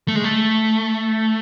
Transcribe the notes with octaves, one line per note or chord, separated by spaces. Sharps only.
A3
G#3
A3